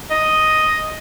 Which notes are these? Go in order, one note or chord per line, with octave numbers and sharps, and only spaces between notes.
D#5